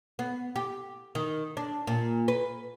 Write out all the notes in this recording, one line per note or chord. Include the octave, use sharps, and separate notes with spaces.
B3
G4
D#3
D4
A#2
B4